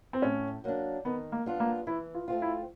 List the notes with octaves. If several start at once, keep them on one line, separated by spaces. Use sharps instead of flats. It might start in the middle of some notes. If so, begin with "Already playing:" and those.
C4
A2 C#4
F#3 A#3 D4
D#3 B3
A#3
G3 B3 D4 F4
A#3
E3 E4
F4
A3 C4 F4
E4